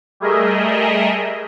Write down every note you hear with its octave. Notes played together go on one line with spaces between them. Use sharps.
G3 A3 G#4 A#4 D#5 E5